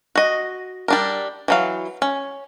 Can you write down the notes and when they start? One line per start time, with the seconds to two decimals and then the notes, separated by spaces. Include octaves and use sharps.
0.15 F#4 D#5
0.88 G3 D4 A#4
1.48 E3 F#3 F5
2.02 C#4